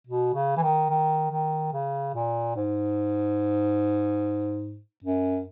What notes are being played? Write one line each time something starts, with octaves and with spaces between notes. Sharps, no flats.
B2
C#3
E3
D#3
D#3
D#3
C#3
A#2
G#2
F#2